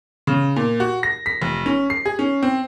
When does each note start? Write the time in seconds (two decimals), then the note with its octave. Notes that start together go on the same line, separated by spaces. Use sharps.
0.27 C#3
0.56 A#2
0.80 F#4
1.03 A#6
1.26 B6
1.42 F1
1.66 C#4
1.90 C7
2.05 G#4
2.19 C#4
2.43 C4